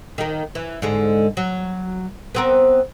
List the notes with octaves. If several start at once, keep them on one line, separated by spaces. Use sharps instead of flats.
D#3 A#3
E3
G#2 D3 G#3
F#3
B3 C4 A#4